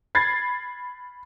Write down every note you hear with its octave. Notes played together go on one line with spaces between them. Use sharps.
B5 G#6 A6 C7